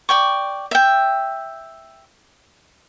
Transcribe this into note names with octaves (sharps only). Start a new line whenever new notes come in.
D5 G5 C#6
E5 G5